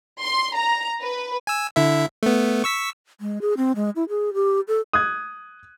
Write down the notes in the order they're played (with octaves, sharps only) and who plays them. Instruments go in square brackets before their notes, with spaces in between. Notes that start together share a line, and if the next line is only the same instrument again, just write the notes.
[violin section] C6
A#5
B4
[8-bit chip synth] G#5 E6
D3 E4 E5
A3 B3
C#6 E6 B6
[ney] G#3
G#4
C4
G#3
E4
G#4
G4
A4
[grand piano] D#6 F#6 G#6